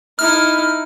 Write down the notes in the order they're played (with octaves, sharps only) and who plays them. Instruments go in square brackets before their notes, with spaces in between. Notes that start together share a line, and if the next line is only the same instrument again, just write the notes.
[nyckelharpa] D#4 E4 [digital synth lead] F6